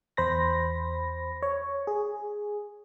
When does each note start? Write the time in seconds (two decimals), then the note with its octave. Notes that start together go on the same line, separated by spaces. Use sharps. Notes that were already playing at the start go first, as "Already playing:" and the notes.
0.17 E2 C5 B5 A#6
1.43 C#5
1.87 G#4